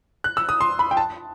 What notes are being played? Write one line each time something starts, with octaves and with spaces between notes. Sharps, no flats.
F#6
E6
D#6
C6
B5
G5
A5